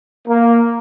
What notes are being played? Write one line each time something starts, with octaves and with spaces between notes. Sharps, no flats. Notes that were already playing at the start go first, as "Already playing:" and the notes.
A#3